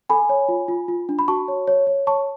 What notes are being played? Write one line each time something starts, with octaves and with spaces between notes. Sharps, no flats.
A4 G#5 B5
C#5
F4
F4
F4
D4
B5
F#4 A5 C#6
C#5
C#5
C#5
C#5 A5 C#6